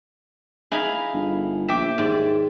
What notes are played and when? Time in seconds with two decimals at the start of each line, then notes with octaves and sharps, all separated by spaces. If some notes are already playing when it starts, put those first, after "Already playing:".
0.72 D#4 E4 G#4 F5 B5
1.13 G1
1.68 A#1 E5 G5 D6
1.98 D#2 G#2 D5